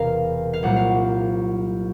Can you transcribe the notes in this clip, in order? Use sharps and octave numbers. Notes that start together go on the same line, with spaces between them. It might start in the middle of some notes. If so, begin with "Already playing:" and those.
Already playing: E1 E2 C3 A#4 F5
F5
C2 A#2 F#3 A#3 F#5
F5